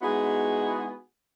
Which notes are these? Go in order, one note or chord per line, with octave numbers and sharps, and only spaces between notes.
G#3 B3 D#4 E4 F#4 G#4